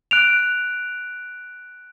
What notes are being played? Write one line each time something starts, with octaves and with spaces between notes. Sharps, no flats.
F#6 D7 F7